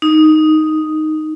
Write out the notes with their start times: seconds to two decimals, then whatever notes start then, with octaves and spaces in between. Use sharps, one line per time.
0.02 D#4